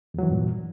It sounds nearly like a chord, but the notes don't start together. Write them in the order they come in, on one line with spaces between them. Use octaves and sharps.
E2 F#3 E3 G2 A#2